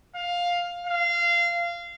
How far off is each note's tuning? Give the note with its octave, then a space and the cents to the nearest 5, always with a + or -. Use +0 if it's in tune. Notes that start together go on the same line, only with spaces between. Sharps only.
F5 +10
F5 -20